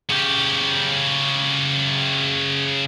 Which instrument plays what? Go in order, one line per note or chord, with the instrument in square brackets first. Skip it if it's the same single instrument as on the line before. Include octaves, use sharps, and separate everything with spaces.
[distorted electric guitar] C#3 G4